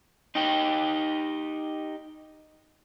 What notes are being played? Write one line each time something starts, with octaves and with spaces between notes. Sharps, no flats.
D#4 G4